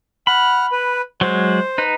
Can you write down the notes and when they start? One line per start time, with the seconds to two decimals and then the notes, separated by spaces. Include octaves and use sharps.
0.27 F#5 B5 F6
0.72 B4
1.21 F#3 G#3 C5
1.78 D#4 B4